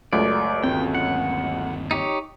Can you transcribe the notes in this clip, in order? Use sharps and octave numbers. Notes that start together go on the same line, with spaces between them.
C#2 F#2 A3 D5
G1 D#2 C4 G5
F#5
D#4 G4 C#5